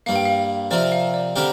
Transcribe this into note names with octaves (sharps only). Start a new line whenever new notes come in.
G2 G3 A#3 F5
G5
F5
C3 F3 C4 A#4 D5
F5
D5
D3 G3 C4 G4 A#4